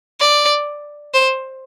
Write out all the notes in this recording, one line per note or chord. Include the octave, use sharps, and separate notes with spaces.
D5
C5